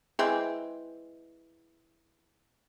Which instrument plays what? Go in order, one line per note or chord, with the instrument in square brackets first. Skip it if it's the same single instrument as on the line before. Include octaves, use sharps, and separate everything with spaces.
[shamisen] E3 G#3 C4